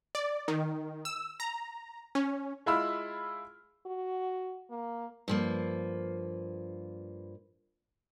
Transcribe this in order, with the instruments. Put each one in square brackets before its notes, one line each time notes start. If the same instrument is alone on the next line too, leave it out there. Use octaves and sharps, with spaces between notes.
[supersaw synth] D5
D#3
E6
A#5
C#4
[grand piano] G#3 E4 F4 B5 E6 F6
[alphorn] F#4
A#3
[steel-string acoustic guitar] G2 F3 A#3